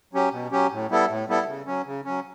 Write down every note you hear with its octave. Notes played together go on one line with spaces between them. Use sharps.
F#3 C#4 G4
B2
F#3 C#4 G4
A2
G3 B3 E4 A4
A2
G3 B3 E4 A4
C#3
F#3 C#4
C#3
F#3 C#4